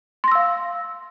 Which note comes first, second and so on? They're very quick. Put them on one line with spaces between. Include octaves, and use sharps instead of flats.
C6 A#6 E6 F5